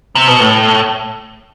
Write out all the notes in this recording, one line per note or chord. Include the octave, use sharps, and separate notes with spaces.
C3
B2
A2